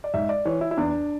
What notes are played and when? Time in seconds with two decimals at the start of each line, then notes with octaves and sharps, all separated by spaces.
0.04 D5
0.14 G#2 E5
0.29 D5
0.45 E3 C#5
0.61 E4
0.71 E4
0.77 E2 D4